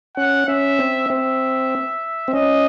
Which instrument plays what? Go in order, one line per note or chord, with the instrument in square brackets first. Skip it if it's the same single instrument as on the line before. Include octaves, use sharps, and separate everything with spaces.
[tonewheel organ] C#4 [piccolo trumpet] F#5
[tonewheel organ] C#4 [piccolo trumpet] E5
[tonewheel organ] C4
[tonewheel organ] C4 [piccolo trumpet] E5
[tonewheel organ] C4
[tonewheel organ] C#4 [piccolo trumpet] D#5